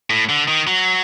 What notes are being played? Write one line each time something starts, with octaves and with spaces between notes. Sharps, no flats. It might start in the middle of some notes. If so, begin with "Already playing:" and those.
A2
D3
D#3
F#3